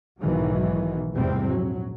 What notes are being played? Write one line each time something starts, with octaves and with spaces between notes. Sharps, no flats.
B1 G#2 D#3 E3 F#3
F1 E2 G#2 C3 G3 C4
A#1 F#3